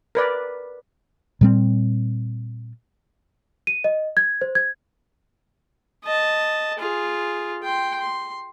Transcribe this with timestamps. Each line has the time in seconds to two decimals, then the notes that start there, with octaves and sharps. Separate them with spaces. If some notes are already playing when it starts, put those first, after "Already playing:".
0.15 A#4 B4 D5
1.41 A#2 G3 C4
3.67 D#7
3.84 D#5
4.17 G#6
4.41 C5
4.55 G#6
6.04 D#5 A5
6.79 F4 G#4
7.63 G5 C6
8.00 C6